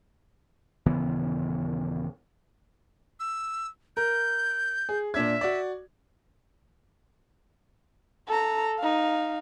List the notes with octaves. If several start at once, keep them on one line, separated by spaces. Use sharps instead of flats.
D#1 C#3 E3 B3
E6
A#4 G6
G#4
A#2 D4 E5 G#6
F#4 D5
A4 A#5
D#4 F5